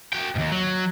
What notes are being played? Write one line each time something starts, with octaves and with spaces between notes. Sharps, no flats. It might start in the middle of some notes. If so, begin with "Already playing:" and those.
F#4 G5
D#2 G#2
F#3